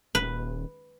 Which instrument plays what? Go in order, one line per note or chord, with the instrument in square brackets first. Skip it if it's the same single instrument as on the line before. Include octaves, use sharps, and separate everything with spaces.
[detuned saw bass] D#1 [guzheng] B4